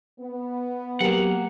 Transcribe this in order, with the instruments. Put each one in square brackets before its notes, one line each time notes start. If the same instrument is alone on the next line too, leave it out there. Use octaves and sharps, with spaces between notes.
[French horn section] B3
[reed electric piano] F#3 G4 A#4 [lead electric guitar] A#3 F#5